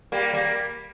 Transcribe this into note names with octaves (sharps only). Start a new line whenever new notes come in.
G3 A#3
G3 A#3